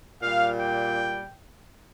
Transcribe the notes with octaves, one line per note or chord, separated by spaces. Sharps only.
A#2 G3 F5
G5